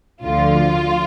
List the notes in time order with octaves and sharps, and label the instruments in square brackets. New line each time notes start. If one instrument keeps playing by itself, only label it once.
[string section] D2 D3 F3 F4